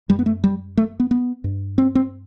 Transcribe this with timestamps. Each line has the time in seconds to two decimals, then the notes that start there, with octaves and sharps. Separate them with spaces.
0.09 F#2 G3
0.19 B3
0.26 A3
0.44 G3
0.77 A3
1.00 B3
1.11 B3
1.44 G2
1.78 C4
1.95 C4